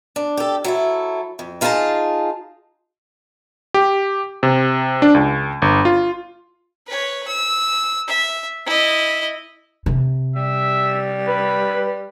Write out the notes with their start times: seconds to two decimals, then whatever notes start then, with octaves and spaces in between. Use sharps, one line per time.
0.16 D4
0.37 G4 A4
0.64 F#3 E4 A4
1.39 F2
1.61 D#4 F4 G#4 C5 A5 A#5
3.74 G4
4.43 C3
5.02 D4
5.15 C#2
5.62 G1
5.85 F4
6.87 B4 C#5
7.27 E6
8.07 E5
8.66 E4 D#5
9.86 C3
10.36 G3 E5
11.28 B4 B5